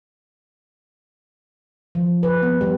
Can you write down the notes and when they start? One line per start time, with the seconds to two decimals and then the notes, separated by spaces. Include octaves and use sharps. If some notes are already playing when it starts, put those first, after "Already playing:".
1.95 F3
2.23 B4
2.42 B3
2.61 G3